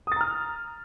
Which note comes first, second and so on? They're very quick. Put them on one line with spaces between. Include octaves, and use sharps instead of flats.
D#6 A6 A#5 F6